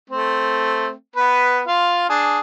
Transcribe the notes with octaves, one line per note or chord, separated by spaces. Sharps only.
A3 C4
B3 B4
F4 F5
D4 G#4